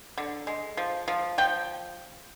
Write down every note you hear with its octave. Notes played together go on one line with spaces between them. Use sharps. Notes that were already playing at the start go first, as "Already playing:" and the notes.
D3
G#3
F3
F3
F3 G5